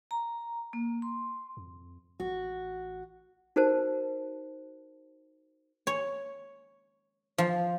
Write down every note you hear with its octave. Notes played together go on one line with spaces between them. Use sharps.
A#5
A#3
C6
F2
A1 F#4
D#4 F#4 A#4 C5 A5
C#5
F3